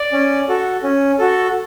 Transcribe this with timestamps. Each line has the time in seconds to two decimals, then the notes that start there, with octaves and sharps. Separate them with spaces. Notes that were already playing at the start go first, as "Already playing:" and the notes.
Already playing: D5
0.12 C#4
0.49 F#4 A4
0.83 C#4
1.19 F#4 A4